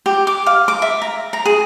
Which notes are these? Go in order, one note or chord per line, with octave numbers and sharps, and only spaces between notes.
G4
D6
F5
D6
E5
A#5
A#5
G#4